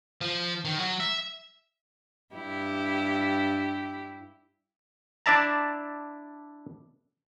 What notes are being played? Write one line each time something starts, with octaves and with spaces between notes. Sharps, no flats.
F3
D#3
F#3
E5
G2 E4 G4
D4 E4 D5 E5 A5 A#5